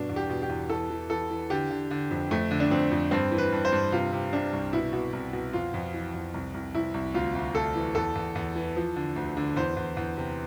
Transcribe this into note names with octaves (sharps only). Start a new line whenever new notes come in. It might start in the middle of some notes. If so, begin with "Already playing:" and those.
Already playing: G2 B2 D4
E2
G4
B2
G4
E2
E3 A4
E3
E3 A4
E3
D3 G4
D3
D3
F2
F2 A3
D3
D4
F2 C4
F2
G2 C4
E3
B4
G2
C5
G2
C3 F4
C3
C3 D4
C2
B2 E4
B2
C2
B2
F2 F4
F2
E3
F2
C2
C2
C2 E4
C2
D2 F4
D2
D2 A4
E3
E2 A4
E2
E2
E3
F3
D3
D2
D3
E2 C5
E2
E2
C3